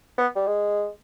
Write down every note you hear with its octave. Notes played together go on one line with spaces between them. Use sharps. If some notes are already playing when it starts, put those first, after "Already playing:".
B3
G3
G#3